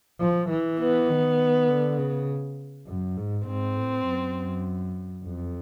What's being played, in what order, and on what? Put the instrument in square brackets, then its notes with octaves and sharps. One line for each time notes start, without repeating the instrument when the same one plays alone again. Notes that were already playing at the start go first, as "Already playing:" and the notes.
[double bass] F3
E3
[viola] B3
[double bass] D#3
D3
C#3
F#2
G#2
[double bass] G#2 [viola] C4
[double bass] A2
F#2
F2